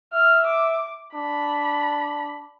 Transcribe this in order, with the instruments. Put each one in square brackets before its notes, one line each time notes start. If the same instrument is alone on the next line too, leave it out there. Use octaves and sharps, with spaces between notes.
[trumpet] E5 [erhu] F6
[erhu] D6
[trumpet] D4 [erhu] B5